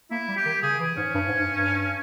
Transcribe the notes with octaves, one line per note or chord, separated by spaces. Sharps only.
A#3 E4
G3
G4
D#3
C#3 G#4
E3
G#2 C#4
G2
G#2
G2
G2